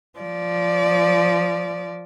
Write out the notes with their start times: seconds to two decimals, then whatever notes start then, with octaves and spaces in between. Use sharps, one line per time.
0.19 F3 D5